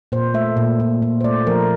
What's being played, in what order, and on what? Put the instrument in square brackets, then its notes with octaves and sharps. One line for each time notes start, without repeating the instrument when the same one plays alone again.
[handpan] A#2 C5
A3 E5
A#2
A#2
A#2
C5
A3 D5
F3 A#4